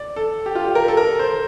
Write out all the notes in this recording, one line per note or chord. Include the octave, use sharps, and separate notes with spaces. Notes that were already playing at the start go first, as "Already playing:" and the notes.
Already playing: D5
A4
G4
F4
G4
A#4
A4
A#4
C5